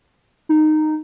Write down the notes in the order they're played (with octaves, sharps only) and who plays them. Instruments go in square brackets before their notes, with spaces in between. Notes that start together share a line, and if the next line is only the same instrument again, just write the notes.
[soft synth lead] D#4